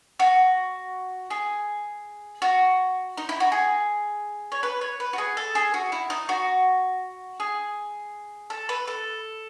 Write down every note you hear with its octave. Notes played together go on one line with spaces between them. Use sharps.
F#4
G#4
F#4
D#4
E4
F#4
G#4
C#5
B4
C#5
B4
F#4
G#4
A4
G#4
F#4
E4
D#4
F#4
G#4
A4
B4
A4